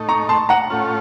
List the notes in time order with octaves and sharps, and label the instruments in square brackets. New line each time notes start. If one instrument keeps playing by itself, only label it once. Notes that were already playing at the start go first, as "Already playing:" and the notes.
Already playing: [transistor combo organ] A2 A3 D#4
[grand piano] A#5 C#6
A5 C6
F#5 A#5
[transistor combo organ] A2 A3 C#4 F4